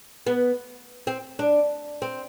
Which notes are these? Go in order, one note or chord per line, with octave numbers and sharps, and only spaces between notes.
B3
C4
D4
C4